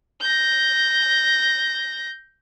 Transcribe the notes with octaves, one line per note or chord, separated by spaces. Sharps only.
G6 A#6